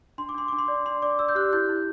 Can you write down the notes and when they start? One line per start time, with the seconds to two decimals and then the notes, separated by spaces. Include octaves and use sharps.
0.18 D4 C6
0.29 D6
0.34 D4 C6
0.48 D4 D6
0.59 C6
0.68 D5
0.85 D4 C6
1.02 D5 D6
1.19 D5 E6
1.29 G6
1.35 G4 F#6
1.53 E4 G6
1.69 E4